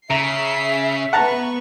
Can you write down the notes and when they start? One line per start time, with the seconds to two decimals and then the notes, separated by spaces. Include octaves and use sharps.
0.10 C#3 E5 A#5 C7
1.13 B3 B4 F#5 A5 A#5 C#6